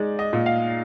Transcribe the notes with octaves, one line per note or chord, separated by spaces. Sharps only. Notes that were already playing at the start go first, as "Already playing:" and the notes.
Already playing: G#3 D#4 D5
D#5
A#2
F5